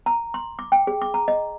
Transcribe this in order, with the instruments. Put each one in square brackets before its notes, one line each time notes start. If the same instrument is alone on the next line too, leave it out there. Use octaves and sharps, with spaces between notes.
[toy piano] A#5
C6
D6
G5
G#4
D6
A#5
D#5